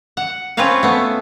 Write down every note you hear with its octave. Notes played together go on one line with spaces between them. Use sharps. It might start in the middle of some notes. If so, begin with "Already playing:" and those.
F#5
C4 C#4 F4 B4 C#5 F5
A3 B3